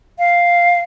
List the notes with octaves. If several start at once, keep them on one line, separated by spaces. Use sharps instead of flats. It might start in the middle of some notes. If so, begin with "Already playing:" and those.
F5